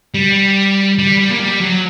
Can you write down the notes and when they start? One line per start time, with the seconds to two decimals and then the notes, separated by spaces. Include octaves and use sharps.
0.14 G3
0.99 G3
1.20 G3
1.31 A#3
1.40 G3
1.61 F#3